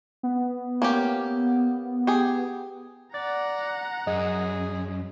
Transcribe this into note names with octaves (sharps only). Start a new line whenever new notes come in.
B3
A#3 C#4 G4
G4 G#4
D5 F#5 A#5 A6
F#2 G#4 D#5